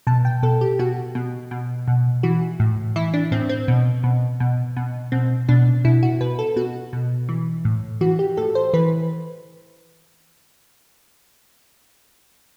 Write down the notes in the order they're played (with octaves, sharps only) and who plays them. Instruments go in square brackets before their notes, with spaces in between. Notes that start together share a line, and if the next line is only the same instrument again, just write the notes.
[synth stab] B2 A5
G5
B2 A4
G4
B2 F#4
B2
B2
B2
E3 F#4
A2
E3 E4
D4
A2 C4
C4
B2
B2
B2
B2
B2 C4
B2 D4
B2 E4
F#4
B2 B4
A4
B2 F#4
B2
E3
A2
E3 F#4
G4
A2 A4
C5
E3 B4